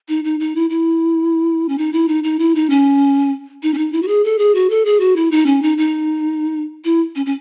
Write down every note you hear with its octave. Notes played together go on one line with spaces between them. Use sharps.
D#4
D#4
D#4
E4
E4
C#4
D#4
E4
D#4
D#4
E4
D#4
C#4
D#4
C#4
D#4
E4
F#4
G#4
A4
G#4
F#4
A4
G#4
F#4
E4
D#4
C#4
D#4
D#4
E4
C#4
C#4